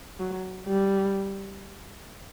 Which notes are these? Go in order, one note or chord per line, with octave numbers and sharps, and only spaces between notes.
F#3
G3